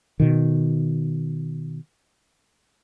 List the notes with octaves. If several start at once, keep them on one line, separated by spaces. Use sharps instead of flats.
B2 D#3